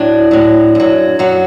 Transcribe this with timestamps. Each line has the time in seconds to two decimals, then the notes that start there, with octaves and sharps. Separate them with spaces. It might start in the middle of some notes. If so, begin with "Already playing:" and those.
Already playing: A2 F#3 D4
0.31 A2 F#3
0.75 F#2 F#3
1.19 F#2 F#3 F#4